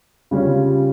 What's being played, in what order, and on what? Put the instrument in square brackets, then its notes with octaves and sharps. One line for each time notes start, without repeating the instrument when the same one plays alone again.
[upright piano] C#3 G3 C#4 F4